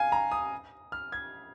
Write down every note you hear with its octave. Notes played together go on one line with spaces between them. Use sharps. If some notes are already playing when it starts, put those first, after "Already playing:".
Already playing: F5 G#5
A#5
D#6
F6
G#6